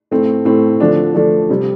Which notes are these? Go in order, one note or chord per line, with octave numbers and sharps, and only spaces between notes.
A2 A3 C4
A2 A3 C4
D3 F3 A3 D4
D3 F3 A3 D4
C3 G3 C4